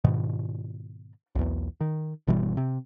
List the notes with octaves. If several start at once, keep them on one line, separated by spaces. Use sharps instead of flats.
G#2 B2 D#3
B1 E2
D#3
G1 B2 E3 G3
C3